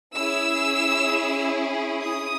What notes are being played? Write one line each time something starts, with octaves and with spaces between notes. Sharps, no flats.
C#4 E4 G#4 E6
D#6